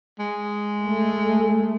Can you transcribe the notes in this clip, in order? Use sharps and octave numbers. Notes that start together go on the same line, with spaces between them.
G#3
A3